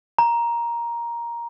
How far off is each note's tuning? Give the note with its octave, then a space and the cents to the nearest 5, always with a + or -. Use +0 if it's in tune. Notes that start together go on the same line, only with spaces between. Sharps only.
A#5 +10